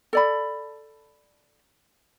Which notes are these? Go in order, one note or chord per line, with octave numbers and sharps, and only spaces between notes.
A4 D5 B5